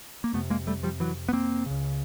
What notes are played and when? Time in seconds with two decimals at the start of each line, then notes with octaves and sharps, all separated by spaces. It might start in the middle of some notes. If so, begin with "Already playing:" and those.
0.24 A#3
0.33 F2 C3 A3 B3
0.50 G#3 A#3
0.67 G3 A3
0.83 F3 G3
1.00 E3 F#3
1.29 B3
1.33 A#3 C4
1.66 C#2 C#3